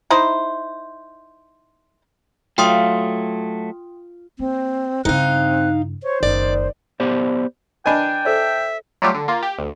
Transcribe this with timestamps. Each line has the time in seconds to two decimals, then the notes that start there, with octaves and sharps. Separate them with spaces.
0.10 D#4 E4 C5
2.58 F#3 A3 F4 G5 C6 D#6
4.39 A#3 C4
5.05 G2 C#3 C4 D#4 F5 F#6
6.03 C5 C#5
6.23 F#1 D#3 D5
7.00 B3 G4 C5 D5
7.86 D4 B4 D#5 G5 G#5 B5
8.25 A4 C5 D5 E5
9.02 F#3 G3 A3 F4 G4
9.14 D3
9.28 A#3 F4
9.43 G4
9.59 D2